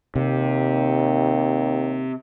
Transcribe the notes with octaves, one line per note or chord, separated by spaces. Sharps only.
D#2 C3